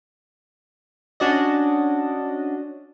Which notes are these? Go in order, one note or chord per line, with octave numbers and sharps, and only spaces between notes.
C#4 D4 F#4 D5 D#5